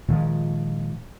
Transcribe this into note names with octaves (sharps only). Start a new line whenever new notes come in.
A#2 D#3 F3 G#3